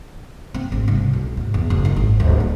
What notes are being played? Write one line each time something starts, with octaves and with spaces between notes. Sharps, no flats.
C4
G#1
C2
B1
G#2
E2
F#1
D#3
G#1
D1
F3